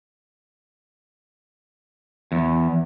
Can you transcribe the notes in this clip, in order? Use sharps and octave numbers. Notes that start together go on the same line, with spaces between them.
E2